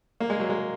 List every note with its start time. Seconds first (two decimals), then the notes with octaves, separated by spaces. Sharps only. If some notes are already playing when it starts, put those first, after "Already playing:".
0.20 A#3
0.30 G#3
0.40 F#3
0.50 G#3